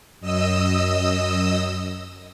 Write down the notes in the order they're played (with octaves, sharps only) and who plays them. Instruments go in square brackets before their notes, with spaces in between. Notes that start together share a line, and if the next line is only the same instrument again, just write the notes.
[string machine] F#2 D#5 D#6 E6